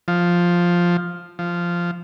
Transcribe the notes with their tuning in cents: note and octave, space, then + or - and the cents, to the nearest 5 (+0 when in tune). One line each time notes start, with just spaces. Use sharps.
F3 +0
F3 -10